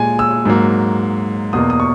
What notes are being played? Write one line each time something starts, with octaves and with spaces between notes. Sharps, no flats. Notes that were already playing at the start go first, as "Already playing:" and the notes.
Already playing: A#2 G#3 G#5
E6
G#2 F#3 A#3
E2 B2 A#3 D#6
D#6
C#6